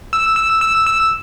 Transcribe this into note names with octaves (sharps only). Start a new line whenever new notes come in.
E6
E6
E6
E6